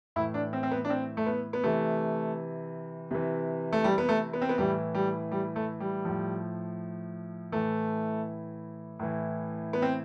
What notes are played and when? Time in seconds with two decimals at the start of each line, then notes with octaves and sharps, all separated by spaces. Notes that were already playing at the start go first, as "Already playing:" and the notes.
0.16 A2 E4
0.19 E3
0.34 D4
0.53 C4
0.63 C4
0.71 B3
0.85 D4
0.90 C4
1.17 A3
1.26 B3
1.53 B3
1.64 C3 E3 A3
3.11 C3 E3
3.72 A3
3.84 G3
3.98 B3
4.09 A3
4.33 B3
4.42 C4
4.49 B3
4.58 A2 E3 G3
4.95 G3
5.32 G3
5.56 A3
5.80 G3
6.05 A2 F3
7.52 A2 E3 A3
8.99 A2 E3
9.73 B3
9.82 C4